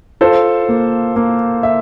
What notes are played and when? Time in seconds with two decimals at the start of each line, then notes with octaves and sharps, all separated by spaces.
0.21 F4 A4 C5
0.69 A#3
1.16 A#3
1.63 E5